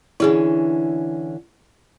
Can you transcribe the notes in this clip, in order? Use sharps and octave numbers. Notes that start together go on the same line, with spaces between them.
D3 E3 C#4 E4 G#4